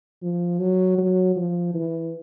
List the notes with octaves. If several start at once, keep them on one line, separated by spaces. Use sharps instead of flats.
F3
F#3
F#3
F3
E3